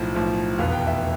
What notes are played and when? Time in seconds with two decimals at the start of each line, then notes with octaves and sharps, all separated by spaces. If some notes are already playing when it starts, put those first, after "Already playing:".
Already playing: B1 A2 F3
0.15 B1 A2 F3
0.58 F1 E2 B2 B3 F5
0.72 G5
0.87 E5